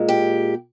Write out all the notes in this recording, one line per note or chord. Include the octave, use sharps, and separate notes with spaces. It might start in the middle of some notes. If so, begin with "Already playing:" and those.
Already playing: A#2 G#3
G4